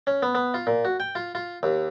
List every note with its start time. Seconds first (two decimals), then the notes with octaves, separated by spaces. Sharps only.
0.07 C#4
0.23 B3
0.35 B3
0.54 F4
0.67 A#2
0.85 F#4
1.00 G5
1.15 F4
1.35 F4
1.63 D#2